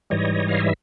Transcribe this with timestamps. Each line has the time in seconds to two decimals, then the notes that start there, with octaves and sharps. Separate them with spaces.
0.10 G#2 E3 G3 C#5 D#5
0.48 F5
0.60 E5